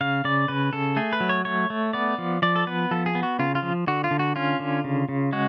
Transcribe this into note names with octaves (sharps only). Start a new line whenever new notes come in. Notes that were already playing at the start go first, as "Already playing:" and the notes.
C#3 F5
C#3 D5
C#3 B4
C#3 A4
A3 G#4
B4
F#3
C#5
A3 C#5
A3
B3 D5
F3
F3 D5
A4
B3 B4
F3 A4
G#4
B3
F#4
C#3 F4
F4
F3
D3 F#4
F4
D3
F#4
C#4 F4
D3
C#3
C#3
G#3 F#4